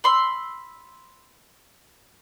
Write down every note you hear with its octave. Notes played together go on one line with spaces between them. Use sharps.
B5 C6 E6